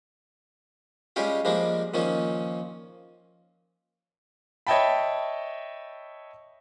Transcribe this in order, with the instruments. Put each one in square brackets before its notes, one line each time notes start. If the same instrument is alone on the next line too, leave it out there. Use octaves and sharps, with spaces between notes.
[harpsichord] G3 G#3 C#4 F4 G4
F3 G3 G#3 A#3 D4
A#2 D#3 F3 C#4
[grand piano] C#5 D#5 E5 G5 A5 B5